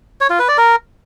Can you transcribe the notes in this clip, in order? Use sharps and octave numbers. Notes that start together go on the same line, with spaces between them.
C#5
F4
B4
D5
A#4